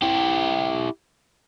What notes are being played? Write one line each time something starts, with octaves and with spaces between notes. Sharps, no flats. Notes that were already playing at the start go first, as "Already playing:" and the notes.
E4 G4